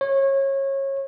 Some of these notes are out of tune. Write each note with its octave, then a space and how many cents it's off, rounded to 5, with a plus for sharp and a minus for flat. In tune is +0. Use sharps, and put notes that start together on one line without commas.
C#5 -25